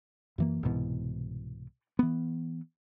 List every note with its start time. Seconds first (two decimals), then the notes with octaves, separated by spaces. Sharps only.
0.38 F#2 E3 A#3
0.63 C2 G#2 B2 E3
1.99 E3 B3